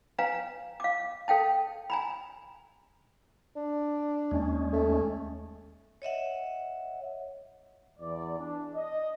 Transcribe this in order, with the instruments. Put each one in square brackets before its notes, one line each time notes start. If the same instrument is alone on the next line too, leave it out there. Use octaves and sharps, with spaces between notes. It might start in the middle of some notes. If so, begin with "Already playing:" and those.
[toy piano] B4 F5 G#5 A#5
F5 D6
A4 F5 G5 A5
G#5 A#5 B5
[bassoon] D4
[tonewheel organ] D#2 G#3 C#4
[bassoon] A3
[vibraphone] C#5 D#5 E5 F#5
[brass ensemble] E2 D5
D4
D#5